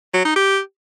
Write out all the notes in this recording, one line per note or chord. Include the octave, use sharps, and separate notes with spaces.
F#3
D#4
G4